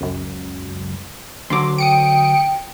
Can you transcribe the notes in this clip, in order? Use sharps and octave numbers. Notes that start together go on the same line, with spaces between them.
C#2 F#2
D2 D3 F#3 C6 D6
G5 D#6 C#7 D7